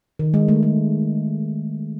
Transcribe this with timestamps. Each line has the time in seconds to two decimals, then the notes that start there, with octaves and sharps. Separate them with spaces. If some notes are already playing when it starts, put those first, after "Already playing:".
0.19 D#3
0.34 G#3
0.48 A3
0.63 A3